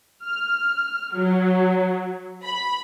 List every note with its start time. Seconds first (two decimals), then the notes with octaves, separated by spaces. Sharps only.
0.24 F6
1.13 F#3
2.43 B5